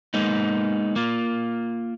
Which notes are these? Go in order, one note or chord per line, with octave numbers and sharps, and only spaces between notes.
G#3 A#3 B3 D#4
A#3 F4